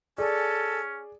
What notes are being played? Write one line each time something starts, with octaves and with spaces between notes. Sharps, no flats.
C#4 G#4 A4 D5